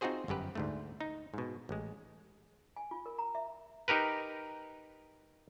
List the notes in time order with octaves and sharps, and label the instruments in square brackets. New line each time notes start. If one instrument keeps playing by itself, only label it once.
[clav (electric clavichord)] C4 D#4 F4 F#4 G#4 C5
G1 F#2 G4 B4
D2 G#2 A3
D#4
G#2 B2
A1 G#3
[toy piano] G#5
F4
A#4
A#5
E5
[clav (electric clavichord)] D#4 G4 A#4 B4